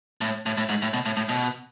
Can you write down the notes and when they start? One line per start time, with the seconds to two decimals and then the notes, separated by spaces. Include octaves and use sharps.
0.21 A2
0.46 A2
0.58 A2
0.69 G#2
0.82 A2
0.93 B2
1.06 A2
1.17 A2
1.29 B2